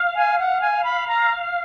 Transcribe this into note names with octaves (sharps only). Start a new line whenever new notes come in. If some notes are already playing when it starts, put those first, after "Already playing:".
Already playing: F5
G#5
F#5
G#5
B5
A#5